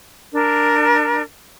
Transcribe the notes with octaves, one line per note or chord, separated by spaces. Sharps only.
D4 A#4